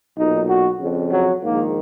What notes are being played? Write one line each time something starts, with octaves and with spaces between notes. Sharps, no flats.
B1 A#2 D#4
F#4
F2 C#3
F#3
A#1 G#2 D#3 A#3